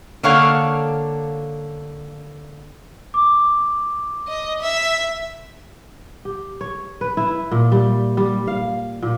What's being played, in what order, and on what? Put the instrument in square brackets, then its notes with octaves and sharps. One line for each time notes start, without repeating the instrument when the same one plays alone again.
[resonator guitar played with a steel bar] D3 A#3 A4 C#5 F5 F#5
[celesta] D6
[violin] D#5
E5
[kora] G4
C#5
B4
E4
A#2
G3
G3
F5
A#2